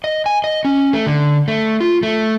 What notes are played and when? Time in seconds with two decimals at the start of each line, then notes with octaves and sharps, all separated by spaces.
0.04 D#5
0.26 G#5
0.44 D#5
0.65 C#4
0.93 A3
1.07 D3
1.48 A3
1.80 F4
2.03 A3